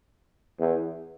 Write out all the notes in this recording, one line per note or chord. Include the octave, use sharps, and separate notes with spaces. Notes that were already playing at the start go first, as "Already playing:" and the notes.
E2